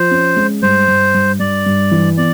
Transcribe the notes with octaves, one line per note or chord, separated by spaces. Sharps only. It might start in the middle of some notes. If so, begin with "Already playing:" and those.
Already playing: F3 C5
C#4
G#3
G2 C5
G2
G2
G2 D5
G2
E3
B3 D5